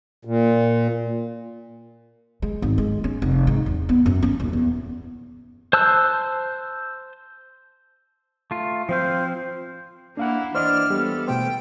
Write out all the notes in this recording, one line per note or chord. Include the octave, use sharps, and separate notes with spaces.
A#2
G#3
G#1
G#3
C#4
F1
G#2
E2
B3
F#2
C#4
D#1
E2
C5 A5 E6 F#6
A3 F4
F3 C4 C5 F5
A#3 D4 E4 F5 F#5
E3 D4 C5 D5 D#5 F6
E3 G3 B3 G4 A4
B2 A3 C5 G5